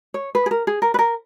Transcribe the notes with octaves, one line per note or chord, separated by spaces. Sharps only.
C#5
B4
G#4
A#4
G#4
A#4
B4
A#4